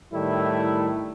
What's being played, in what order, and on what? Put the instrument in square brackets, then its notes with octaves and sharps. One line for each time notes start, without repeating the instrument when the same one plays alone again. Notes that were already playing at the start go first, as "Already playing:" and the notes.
[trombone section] A2 D#3 G3 A3 E4